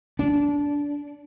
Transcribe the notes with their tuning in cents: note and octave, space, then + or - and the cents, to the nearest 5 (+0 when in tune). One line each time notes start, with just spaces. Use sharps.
D4 -20